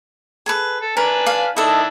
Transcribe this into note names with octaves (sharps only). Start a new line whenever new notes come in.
G#4 A4 B4
A4
D4 A#4 B4 G#5
F5
D#3 D4 E4 A4 D#5